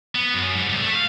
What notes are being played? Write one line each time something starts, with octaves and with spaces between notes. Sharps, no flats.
B3
F#2
G#2
C2
A3
F5